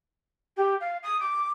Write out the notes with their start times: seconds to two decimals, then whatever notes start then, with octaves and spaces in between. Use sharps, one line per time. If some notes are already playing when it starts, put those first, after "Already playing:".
0.56 G4
0.80 F5
1.02 D#6
1.19 D6